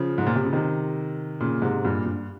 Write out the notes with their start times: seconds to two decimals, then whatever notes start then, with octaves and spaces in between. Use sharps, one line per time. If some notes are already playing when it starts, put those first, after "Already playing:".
Already playing: C#3 F3
0.18 G#2
0.26 A#2
0.35 C3
0.45 C#3
0.53 C3 D#3
1.40 A#2 C#3
1.62 G#2 C3
1.85 G2 A#2
2.05 G2